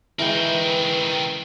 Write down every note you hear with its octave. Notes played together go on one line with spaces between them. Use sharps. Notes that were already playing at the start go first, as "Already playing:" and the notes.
C#3 E3 G#3 C4 A#4 B4 G5